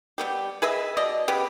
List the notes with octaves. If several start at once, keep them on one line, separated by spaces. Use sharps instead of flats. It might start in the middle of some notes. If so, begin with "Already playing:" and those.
G3 B3 G4
G#4 B4 D#5 E5
B2 D5 D#5
C#3 B3 G4 B4